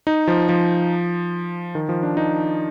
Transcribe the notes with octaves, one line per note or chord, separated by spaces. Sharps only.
D#4
F3
F3
D#3
F3
D4
D#4